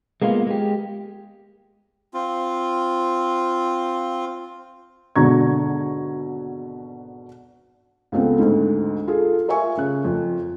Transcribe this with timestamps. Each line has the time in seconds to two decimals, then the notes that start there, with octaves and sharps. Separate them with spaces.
0.22 G#3 A#3 B3 E4 F4
0.47 G#3 G4
2.14 C4 F4
5.16 G#1 B2 D3 A#5 C#6 G#6
8.12 C#2 B3 C4 A4
8.39 D2 G#2
9.08 F4 G#4 A4
9.48 F4 A#4 E5 G#5 C#6
9.77 C#3 F#6
10.04 F2